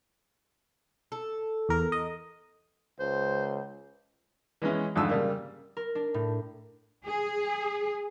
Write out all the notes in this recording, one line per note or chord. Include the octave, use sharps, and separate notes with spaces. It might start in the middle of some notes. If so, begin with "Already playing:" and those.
A4
E2 A#4
D#5
C#2 C5
E3 G#3 B3 C#4 E4
F2 G#2 D3 F3 D#6 E6
C#3 G3 A#3
A#4
D4
A2
G#4